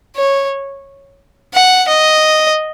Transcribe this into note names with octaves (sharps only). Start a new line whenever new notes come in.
C#5
F#5
D#5